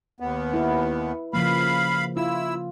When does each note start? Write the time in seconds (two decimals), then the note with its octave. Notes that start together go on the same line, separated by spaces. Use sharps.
0.20 D#2 B3
0.53 E4 B4
1.33 C#3 F3 A#3 F5 B5
2.17 E4 F4 E6